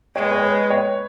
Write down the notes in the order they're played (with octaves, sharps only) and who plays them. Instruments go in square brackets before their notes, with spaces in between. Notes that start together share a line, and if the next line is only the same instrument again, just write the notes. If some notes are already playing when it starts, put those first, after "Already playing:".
[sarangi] G#3 [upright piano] C#5
[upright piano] B4
C#5
B4
C#5